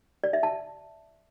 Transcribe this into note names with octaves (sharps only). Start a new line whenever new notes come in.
D5
E5
A5